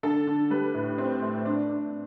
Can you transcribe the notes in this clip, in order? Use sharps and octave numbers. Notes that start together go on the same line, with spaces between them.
D3 A4
D3
G3 B4
A2
C4
A3
D4
D4